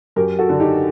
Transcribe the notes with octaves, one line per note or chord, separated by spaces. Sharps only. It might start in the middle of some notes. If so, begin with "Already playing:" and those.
F#2 G4 A#4
F#4 A4
D3
D#4 G4